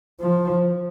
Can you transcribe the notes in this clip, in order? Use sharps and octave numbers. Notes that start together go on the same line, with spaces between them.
F3